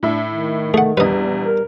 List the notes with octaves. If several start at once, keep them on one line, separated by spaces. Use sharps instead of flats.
A2 D4 E5
D#3
A3 G#4 F#5
A#1 E2 G3 B4 D#5
A#4